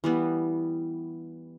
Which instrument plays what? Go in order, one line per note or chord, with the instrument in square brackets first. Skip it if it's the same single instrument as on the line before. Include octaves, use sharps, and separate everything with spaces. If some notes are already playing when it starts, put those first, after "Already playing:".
[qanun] E3 G3 B3